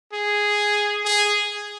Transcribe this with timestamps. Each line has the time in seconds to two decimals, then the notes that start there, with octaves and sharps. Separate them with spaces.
0.13 G#4
1.05 G#4